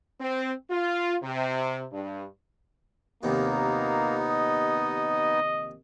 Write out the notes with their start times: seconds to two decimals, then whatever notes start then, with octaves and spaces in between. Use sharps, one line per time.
0.21 C4
0.70 F4
1.23 C3
1.92 G2
3.23 A#1 D#2 C3 A#3 B3 D#4
4.24 D#5